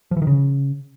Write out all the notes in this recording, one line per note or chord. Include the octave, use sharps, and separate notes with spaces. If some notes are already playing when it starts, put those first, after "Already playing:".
F3
E3
D#3
C#3